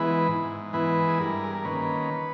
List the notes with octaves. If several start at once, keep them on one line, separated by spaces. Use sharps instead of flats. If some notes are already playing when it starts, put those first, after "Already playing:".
Already playing: E3 G#3 B3 E4 B4
G#2
E3 G#3 B3 E4 B4
G#4
G2 A#4
G#4
A#4
D#3 A#3 C#4 B4